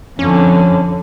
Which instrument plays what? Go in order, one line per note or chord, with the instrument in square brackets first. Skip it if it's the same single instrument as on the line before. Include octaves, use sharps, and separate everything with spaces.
[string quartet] F2 D3 [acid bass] C#4